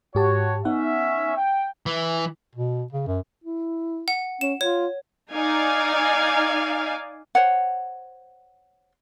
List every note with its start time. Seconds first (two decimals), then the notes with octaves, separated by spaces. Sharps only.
0.15 G#2 F#4 G4 C#5 A5
0.65 B3 C#4 D#4 E5 F#5
1.36 G5
1.86 E3
2.55 B2
2.93 C#3
3.07 F#2
3.44 E4
4.08 F#5
4.41 C#4 E7
4.61 F4 C#5
5.32 D#4 D5 F5 G#5
7.35 C5 C#5 F#5